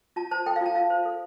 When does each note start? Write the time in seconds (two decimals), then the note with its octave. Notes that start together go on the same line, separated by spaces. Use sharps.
0.16 F4 A5
0.31 C5 A5
0.46 A4 G5
0.56 F5
0.61 F4 A5
0.75 F4 F5
0.90 C5
1.05 A4